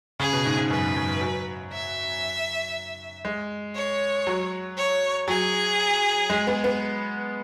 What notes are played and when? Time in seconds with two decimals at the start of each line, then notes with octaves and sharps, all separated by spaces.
0.20 C#3 G#4
0.33 B2
0.46 G#2
0.57 G#2
0.70 F#2 B4
0.96 F#2
1.21 F#3
1.73 E5
3.25 G#3
3.75 C#5
4.27 F#3
4.77 C#5
5.28 F#3 G#4
6.30 G#3
6.47 B3
6.64 B3